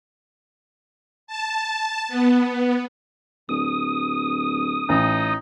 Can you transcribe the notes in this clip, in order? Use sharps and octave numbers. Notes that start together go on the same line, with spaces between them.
A5
B3
D1 D#6
A1 D#4